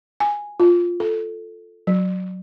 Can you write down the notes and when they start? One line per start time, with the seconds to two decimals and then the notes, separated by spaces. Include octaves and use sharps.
0.20 G#5
0.60 F4
1.00 A4
1.87 F#3